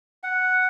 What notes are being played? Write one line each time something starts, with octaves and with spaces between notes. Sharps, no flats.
F#5